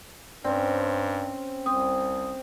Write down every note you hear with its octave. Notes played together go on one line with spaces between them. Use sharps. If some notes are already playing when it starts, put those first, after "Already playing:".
G2 C4 C#4 D5
C2 C4 D#6